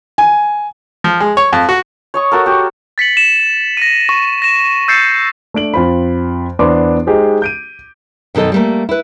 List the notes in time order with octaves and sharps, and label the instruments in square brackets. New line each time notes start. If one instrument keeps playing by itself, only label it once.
[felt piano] G#5
[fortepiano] F3
G#3
C#5
F2
F#4
[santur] C#5 D#5 C#6
F#4 A4 A#4
F#4 G4
[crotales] A6 B6 C#7 F#7
E7
A#6 B6 D#7
C#6
A#6 E7
E6 G6 A6 C7 C#7 E7
[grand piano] A3 D4 D7 F#7
F2 F4 C5 B5
E2 B3 D4 C5 C6 D6
G#3 D#4 G4 G#4 C5
G6 D7 D#7
[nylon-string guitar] F#2 B2 D#3 A4 D#5
G3 A3 A#3
E4 B4